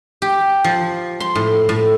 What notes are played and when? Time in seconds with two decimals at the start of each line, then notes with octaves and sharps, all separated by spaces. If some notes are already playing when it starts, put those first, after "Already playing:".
0.22 G4
0.64 F3
1.20 C6
1.35 A2
1.69 A2